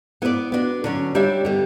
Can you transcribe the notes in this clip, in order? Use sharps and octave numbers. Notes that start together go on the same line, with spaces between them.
B3 E4 B4 D5
B3 D4 F#4
D3 F#3 C#4
G3 D4 G4 C#5 E5
D3 G3 B3